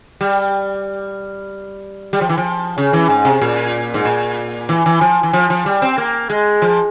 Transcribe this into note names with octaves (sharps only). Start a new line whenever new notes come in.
G3
G3
F3
E3
F3
C#3
E3
G#2
C3
A#2
G#2
A#2
E3
E3
F3
E3
F3
F3
G3
C4
A#3
G#3
F3